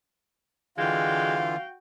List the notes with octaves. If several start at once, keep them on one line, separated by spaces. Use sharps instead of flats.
D3 E3 G#3 F4 F#4 F5 G5